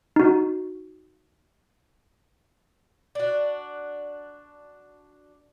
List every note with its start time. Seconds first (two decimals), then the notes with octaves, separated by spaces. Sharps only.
0.16 D#4 F#4
3.15 D4 F#4